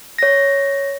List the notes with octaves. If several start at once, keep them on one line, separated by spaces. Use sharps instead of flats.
C#5 A#6